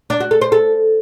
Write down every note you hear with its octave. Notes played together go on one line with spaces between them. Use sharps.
D4
F#4
A4
C5
A4